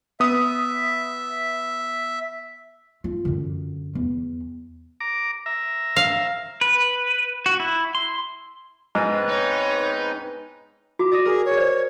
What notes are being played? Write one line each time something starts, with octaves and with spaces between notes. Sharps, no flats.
B3 E5 D#6
F4
F#2 D3
E2
A#5 D6
E5 A#5
F5
B4
F#4
E4
C6
G#2 B3 C4 B4 D#5
D#4 C#5
F#4 D6
D5 D#6 A#6
G#4 A#4
C#5
C5 D5